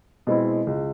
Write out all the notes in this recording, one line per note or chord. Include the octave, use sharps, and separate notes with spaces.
B2 G#3 C4 E4
C#2